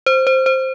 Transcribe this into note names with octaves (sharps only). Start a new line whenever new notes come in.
C5
C5
C5